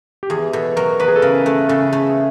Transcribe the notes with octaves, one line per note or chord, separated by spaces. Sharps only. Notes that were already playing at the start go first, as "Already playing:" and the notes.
G4
E2 G#4
B2 A4
F#3 A#4
E2 B4
G#4
A4
C#3 A#4
A3 A4
C#3 A4
A3 G#4
G#4